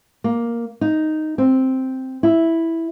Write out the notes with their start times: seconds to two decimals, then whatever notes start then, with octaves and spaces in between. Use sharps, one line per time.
0.24 A#3
0.81 D#4
1.38 C4
2.23 E4